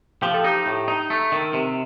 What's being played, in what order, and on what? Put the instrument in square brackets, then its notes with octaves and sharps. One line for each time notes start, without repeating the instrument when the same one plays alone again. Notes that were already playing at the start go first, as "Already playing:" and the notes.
[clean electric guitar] F3 [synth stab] G4
[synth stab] A4
[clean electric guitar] D#4 [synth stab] G4
[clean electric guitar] A2
D#4
A3
D#3
C3